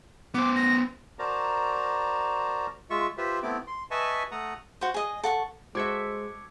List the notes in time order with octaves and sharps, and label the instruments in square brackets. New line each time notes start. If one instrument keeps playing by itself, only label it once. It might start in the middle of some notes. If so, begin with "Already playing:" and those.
[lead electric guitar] B3 C5 [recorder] D6
[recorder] A#6
[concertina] F#4 A#4 C5 D5 A5 A#5
G#3 F4 E5 C#6
F4 G4 B4 C5 E5
A3 B3 C4 E4 D6
C6
B4 D#5 E5 G#5 A5 C#6
A3 F#5 A#5 D#6
[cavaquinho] F#4 C5
G#4 D#5
A4 F#5 C#6
[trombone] G#3 [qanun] F#4 A4 E5 [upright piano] C5 [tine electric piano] D6 G#6 C#7